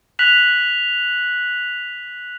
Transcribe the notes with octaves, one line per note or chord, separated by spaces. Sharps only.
F#6 B6 F7 F#7